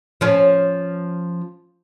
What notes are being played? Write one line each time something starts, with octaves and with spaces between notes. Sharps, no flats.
F3 C#4